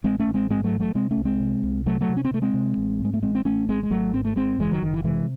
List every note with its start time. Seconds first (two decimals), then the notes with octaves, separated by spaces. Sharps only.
0.04 A1 G#3 C4
0.20 A3 C#4
0.27 A1
0.34 G#3 C4
0.50 G#2 G#3 C4
0.64 F#3 A3
0.72 A1
0.80 F#3 A3
0.95 C3 G#3 C4
1.11 A3 C#4
1.17 C2
1.25 G#3 C4
1.40 C3
1.63 C2
1.86 C3 F#3 A3
2.01 F#3 A3
2.09 C3
2.17 C#4
2.25 C4
2.31 C3 A3
2.42 G#3 C4
2.54 C3
2.77 A1
3.00 G#2 G#3
3.14 A3
3.22 A1 G#3 C4
3.35 C4
3.45 A1 A3 C#4
3.69 G#1 G#3 C4
3.83 G#3
3.90 G#1 F#3 A3
4.13 G#2 C4
4.25 A3
4.36 G#1 G#3 C4
4.59 F#1 E3 G#3
4.71 D#3 F#3
4.82 F#1 D#3
4.94 E3
5.04 C3 E3 G#3